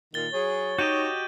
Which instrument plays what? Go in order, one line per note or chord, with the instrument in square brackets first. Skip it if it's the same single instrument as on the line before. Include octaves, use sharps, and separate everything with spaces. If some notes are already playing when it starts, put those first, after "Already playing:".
[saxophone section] A#2 D#3 [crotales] A6 G7
[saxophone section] F#3 G#4 [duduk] C#5
[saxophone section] D#4 [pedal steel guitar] F#4 G4 D#5 [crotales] G6 D#7